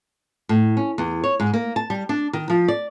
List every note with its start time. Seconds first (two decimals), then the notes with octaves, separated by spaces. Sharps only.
0.49 A2
0.77 C#4
0.98 E2
1.24 C#5
1.40 G#2
1.54 A#3
1.76 A5
1.90 G3
2.09 D4
2.33 D#3
2.50 F3
2.68 D5